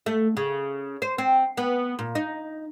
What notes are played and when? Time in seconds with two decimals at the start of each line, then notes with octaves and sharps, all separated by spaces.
0.06 A3
0.37 C#3
1.02 C5
1.18 C4
1.57 B3
1.99 A#2
2.15 D#4